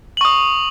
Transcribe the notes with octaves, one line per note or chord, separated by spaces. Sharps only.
C#6 D#6 F#7